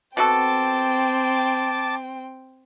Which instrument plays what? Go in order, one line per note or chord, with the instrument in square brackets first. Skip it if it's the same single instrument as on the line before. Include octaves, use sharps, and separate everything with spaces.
[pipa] B2 F#4 A4 [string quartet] C4 G5 [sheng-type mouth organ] A5 D6